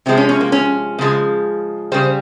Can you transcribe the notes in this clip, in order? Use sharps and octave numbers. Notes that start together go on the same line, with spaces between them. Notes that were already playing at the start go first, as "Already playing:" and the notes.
C3 F3 G#3 C4
C#4
C#4
A#3
C#4
C#3 F3 G#3
C#3 G3 C5